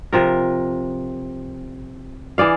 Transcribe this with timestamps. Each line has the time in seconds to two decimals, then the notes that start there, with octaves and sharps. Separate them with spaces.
0.13 C3 F3 A#4
2.38 E3 G#4 D5 F5